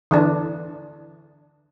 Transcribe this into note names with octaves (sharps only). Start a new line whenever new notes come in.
D3 E3 D4